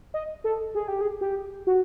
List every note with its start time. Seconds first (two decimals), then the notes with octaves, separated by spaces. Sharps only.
0.14 D#5
0.44 A4
0.75 G#4
0.88 G4
1.01 G#4
1.21 G4
1.67 F#4